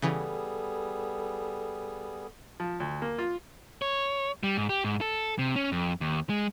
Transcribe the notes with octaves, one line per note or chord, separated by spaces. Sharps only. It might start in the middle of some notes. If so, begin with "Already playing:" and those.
C#3 E3 G3 B3 G#4 A4
F3
D2
A#3
F4
C#5
G3
G#2
G4
G#2
A4
C3
C#4
F2
D#2
G#3